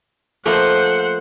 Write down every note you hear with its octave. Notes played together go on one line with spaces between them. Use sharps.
F3 A3 A#3 C5 F#5